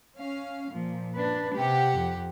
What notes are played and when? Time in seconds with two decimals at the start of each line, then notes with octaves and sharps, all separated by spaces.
0.18 C#4 F5
0.72 A#2 F3
1.15 D4 B4
1.56 C3 G4 F#5
1.97 F2